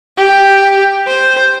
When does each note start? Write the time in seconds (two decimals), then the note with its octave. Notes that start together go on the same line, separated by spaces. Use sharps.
0.17 G4
1.07 C5